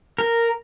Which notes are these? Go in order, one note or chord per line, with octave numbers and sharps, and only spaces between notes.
A#4